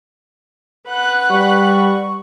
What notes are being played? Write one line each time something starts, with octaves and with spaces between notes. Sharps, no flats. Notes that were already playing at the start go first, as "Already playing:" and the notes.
B4 F#5 F#6
G3 C#6